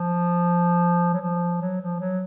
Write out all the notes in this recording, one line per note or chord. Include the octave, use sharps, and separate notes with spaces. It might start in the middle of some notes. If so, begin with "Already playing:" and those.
Already playing: F3
F#3
F3
F#3
F3
F#3